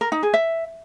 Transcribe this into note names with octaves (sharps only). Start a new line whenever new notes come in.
A#4
D#4
G#4
E5